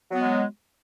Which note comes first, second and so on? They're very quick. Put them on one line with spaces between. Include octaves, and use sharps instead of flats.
F#3 B3 G#3